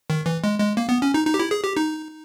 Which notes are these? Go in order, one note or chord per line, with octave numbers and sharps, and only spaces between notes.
D#3
E3
G#3
G#3
A#3
B3
C#4
D#4
D#4
G4
E4
G#4
G4
D#4